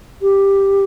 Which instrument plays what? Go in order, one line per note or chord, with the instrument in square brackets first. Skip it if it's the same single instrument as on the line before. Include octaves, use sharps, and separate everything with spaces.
[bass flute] G4